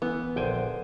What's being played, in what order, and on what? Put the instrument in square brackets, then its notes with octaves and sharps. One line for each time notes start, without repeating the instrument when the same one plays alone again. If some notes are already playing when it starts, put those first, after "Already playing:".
[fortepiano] E3 [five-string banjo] B3
[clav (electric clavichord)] A#1 G5 G#5 [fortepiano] D3 C5